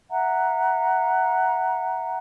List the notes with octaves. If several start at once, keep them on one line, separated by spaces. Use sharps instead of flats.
E5 F#5 A#5